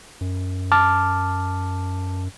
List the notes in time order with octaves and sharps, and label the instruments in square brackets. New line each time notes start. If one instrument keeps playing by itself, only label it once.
[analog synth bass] F#2
[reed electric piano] A5 D6 F6